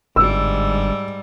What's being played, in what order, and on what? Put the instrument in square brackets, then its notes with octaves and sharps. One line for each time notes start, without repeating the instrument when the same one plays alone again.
[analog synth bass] G1 [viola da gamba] G#2 G3 [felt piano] E6